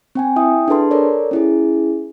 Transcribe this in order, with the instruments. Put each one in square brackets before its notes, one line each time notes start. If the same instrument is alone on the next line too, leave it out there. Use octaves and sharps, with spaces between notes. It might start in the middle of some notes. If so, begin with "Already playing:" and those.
[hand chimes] C4 G5 G#5
E4 E5 G5 D#6
D4 G#4 A4 B4 A5 C6
A4 A#4 C#5 D5
C#4 E4 G#4